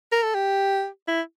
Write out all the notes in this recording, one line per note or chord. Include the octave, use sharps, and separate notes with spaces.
A#4
A4
G4
E4